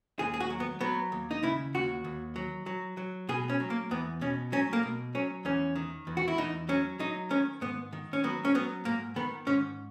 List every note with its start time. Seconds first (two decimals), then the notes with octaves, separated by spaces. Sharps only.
0.19 D#2 G#4
0.34 G#4
0.40 F#4
0.50 F#3
0.60 B3
0.81 F#3 B3
1.12 D#2
1.31 D#4
1.43 C#3 E4
1.74 D#2 F#4
2.04 D#2
2.36 F#3
2.66 F#3
2.97 F#3
3.29 B2 G#4
3.49 C#4
3.60 F#3
3.70 A#3
3.91 E2 B3
4.21 B2 C#4
4.52 F#3 C#4
4.73 A#3
4.83 B2
5.15 F#3 C#4
5.45 E2 C#4
5.76 D#3
6.07 E2
6.17 F#4
6.28 E4
6.38 E2 D#4
6.69 F#3 C#4
6.99 F#3 D#4
7.30 D#3 C#4
7.61 G#2 B3
7.93 D#3
8.13 C#4
8.24 F#3 B3
8.45 C#4
8.55 F#3 B3
8.85 G#2 A#3
9.16 D#3 B3
9.47 G#2 C#4